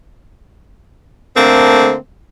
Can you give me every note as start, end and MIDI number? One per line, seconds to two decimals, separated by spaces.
1.36 1.95 50
1.36 1.95 57
1.36 1.95 58
1.36 1.95 60